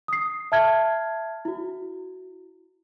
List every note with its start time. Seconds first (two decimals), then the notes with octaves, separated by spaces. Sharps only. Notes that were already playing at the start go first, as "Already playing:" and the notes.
0.08 D#6 C7
0.52 E5 A5 F6 G#6
1.45 E4 F#4